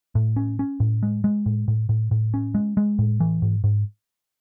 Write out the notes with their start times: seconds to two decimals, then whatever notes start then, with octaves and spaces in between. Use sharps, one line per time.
0.15 A2
0.36 C#4
0.59 C#4
0.80 A2
1.03 G#3
1.24 G#3
1.46 A2
1.68 A2
1.89 A2
2.11 A2
2.34 C#4
2.55 G#3
2.77 G#3
2.99 A2
3.20 E3
3.42 G#2
3.64 G#2